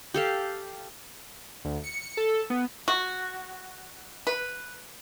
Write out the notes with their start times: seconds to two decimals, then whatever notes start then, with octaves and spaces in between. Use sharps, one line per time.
0.14 G4 A4 F5
1.65 D2
1.84 C#7
2.17 A4
2.50 B3
2.88 F#4
4.27 B4